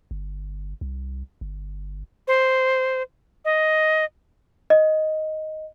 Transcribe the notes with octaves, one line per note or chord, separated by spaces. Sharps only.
G1
C2
G1
C5
D#5
D#5